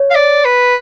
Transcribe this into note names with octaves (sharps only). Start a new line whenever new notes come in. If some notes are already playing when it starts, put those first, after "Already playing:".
Already playing: C#5
F5
D5
B4